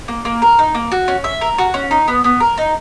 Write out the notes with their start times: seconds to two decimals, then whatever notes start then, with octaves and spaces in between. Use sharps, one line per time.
0.08 A#3
0.25 A#3
0.42 A#4
0.59 D#4
0.75 A#3
0.92 F#4
1.08 C#4
1.24 E5
1.41 A#4
1.58 F#4
1.74 C#4
1.91 D#4
2.08 B3
2.24 B3
2.40 A#4
2.58 D#4